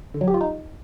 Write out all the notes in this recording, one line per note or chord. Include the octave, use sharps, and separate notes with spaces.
D3
F#3
G4
F4
D#4